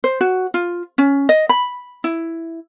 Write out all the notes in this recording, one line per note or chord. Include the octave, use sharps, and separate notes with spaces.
C5
F#4
F4
C#4
D#5
B5
E4